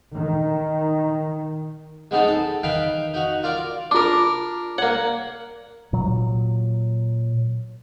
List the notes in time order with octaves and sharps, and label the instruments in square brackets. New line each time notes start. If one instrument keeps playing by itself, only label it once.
[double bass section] D#3
[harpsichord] G#3 B3 C4 D#4 A4
A4
D#3 B4 F5 G5
D#4 F#4
F4 A#4 D5
[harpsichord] D4 A#4 [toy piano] F4 D6
[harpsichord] A#3 F#5 [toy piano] D5
[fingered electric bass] A#2 F#3